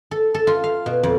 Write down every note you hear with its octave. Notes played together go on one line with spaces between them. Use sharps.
A4
A4
F4
F5
B2
F2